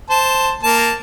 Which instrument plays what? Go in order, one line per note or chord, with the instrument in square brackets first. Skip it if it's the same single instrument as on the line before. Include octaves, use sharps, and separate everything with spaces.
[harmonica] C5 A5
A#3 A5